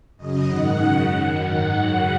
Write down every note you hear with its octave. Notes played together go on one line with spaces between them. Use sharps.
F#2 C#3 D#5
G#2 D#3 F#5
F#2 C#3
F#2 D#3
G#2 D#3 F#5
F#2 C#3